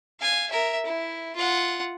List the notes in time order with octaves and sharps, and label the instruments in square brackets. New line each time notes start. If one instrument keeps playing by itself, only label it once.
[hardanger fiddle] F5 G#5
A#4 E5
E4
F4 F#5